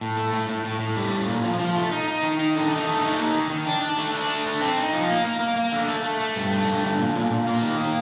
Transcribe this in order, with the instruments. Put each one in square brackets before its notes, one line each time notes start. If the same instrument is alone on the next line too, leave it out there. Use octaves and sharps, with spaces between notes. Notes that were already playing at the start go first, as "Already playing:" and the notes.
[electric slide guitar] A2
A3
A2
A2
A2
A2
G3
A2
A#2
F3
F3
A3
D#4
D#4
D#3
D#4
D3
D#4
A3
D#4
A#3
D#3
D#3
D4
D4
A3
D4
A3
D3
C4
D#4
F3
A#3
A#3
A#3
A#3
D3
A3
A3
A3
G2
A3
G2
D3
A#2
A#2
A#2
A#3
D#3
A#3